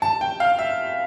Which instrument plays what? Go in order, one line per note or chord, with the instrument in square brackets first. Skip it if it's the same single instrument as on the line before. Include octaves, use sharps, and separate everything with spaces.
[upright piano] A5
G5
F5
E5